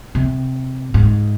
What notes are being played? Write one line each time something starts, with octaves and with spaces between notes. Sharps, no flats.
C3
G#2